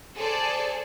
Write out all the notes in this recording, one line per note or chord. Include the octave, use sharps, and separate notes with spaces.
G#4 A4 C5 D5 A5